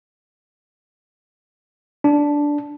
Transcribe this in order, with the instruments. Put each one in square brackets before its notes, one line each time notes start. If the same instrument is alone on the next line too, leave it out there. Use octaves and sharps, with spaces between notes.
[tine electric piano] D4